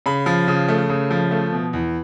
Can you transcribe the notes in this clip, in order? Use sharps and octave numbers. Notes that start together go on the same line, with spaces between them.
C#3 B5
F3
C#3
A3
C#3
F3
A3
B2
E2